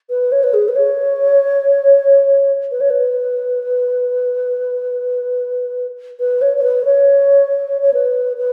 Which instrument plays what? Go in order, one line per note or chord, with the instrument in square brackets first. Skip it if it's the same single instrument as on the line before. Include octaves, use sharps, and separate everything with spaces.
[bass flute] B4
C#5
B4
G#4
B4
C#5
B4
C#5
B4
B4
C#5
C#5
B4
C#5
C#5
B4
B4